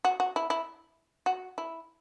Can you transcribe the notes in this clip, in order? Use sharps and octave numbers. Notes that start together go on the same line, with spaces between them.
F#4
F#4
E4
E4
F#4
E4